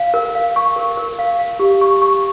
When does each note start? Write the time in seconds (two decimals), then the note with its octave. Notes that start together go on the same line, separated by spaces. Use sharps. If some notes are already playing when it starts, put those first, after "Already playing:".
Already playing: F5
0.14 A#4
0.35 F5
0.56 C#6
0.76 A#4
0.97 A#4
1.19 F5
1.39 F5
1.59 G4
1.81 C#6
2.02 C#6